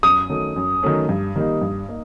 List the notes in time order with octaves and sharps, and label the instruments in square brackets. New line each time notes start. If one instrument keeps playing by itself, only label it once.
[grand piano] F#2 [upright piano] D#6
[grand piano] D#3 F#3 A3 C#4
F#2
D#3 F#3 A3 C#4
G2
D#3 G3 A#3 D#4
G2
A#3 D#4